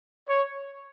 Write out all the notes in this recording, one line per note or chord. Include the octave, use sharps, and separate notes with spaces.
C#5